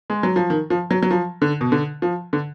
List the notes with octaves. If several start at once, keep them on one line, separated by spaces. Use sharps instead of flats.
G#3
F#3
F3
D#3
F3
F#3
F#3
F3
D3
B2
D3
F3
D3